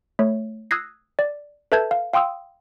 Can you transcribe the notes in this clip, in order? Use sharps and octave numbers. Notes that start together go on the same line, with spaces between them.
A3 C#5
D#6 E6 F#6 G#6 A#6 C7
D5
A4 B4 E5 A5 G6 G#6
F5
F5 G5 C6 D#6 E6